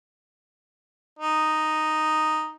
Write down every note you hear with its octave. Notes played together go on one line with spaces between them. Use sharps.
D#4